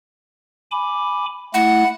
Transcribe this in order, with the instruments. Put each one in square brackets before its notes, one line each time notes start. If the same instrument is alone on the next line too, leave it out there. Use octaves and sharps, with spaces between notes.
[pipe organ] G#5 B5 D6
[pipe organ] A3 E4 [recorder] F#5